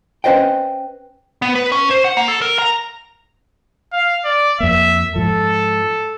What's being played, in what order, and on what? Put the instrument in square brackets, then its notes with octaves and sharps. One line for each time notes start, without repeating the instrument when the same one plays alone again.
[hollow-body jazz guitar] C#4 B4 C5 D#5 G5
[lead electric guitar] B3
B4
C#4
C5
F#5
A#3
A4
A#4
A#5
[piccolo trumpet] F5
D5
[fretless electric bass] F2 A#3 [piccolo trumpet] E5
[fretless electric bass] G#2 F3 [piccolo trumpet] A4